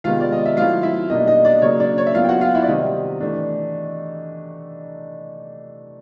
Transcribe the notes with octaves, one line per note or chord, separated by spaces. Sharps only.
C3 D#3 G#3 B3 F4 F5
D5
D#5
E5
F#3 A3 C4 E4 F4 F5
E4 E5
B2 G3 A#3 D4 D#4 D#5
D#4 D#5
D4 D5
C#3 F#3 A#3 D4 C#5
D4 D5
C#5
E5
F#3 B3 E4 F4 F5
G5
F#4 F#5
F4 F5
E4 E5
D5
C3 D#3 G3 C4 D#4 D#5
E3 A3 D4